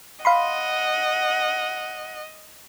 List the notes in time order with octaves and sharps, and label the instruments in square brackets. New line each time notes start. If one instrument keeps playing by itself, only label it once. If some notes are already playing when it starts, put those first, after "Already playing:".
[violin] D#5 [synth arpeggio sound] F5 B5 C6 [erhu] F#5